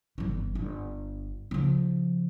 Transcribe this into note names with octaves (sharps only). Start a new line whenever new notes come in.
G1 E3
G1
C#3 F3